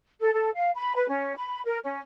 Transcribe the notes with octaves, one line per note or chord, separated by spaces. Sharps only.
A4
A4
F5
B5
B4
C#4
B5
A#4
C#4